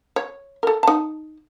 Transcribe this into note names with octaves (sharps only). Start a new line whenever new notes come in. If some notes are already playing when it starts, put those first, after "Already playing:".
C#5
A4 A#4
D#4 A5